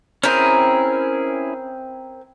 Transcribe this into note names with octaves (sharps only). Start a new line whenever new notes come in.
C4 C#4 E4 G#4 A#4